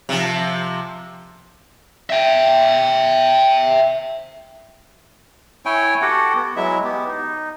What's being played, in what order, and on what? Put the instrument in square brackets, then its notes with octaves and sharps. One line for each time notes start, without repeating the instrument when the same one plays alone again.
[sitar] C3 F3
[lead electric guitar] E5 G5
[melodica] E4 C#5 G5 G#5
F#4 G4 A4 F#5
B3
F#3 G#3 E4 E5
B3 G4
D#4